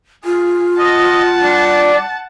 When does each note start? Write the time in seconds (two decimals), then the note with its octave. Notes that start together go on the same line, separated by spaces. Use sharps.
0.25 F4 G#4
0.79 D#5 F#5 A5
1.42 G3 D4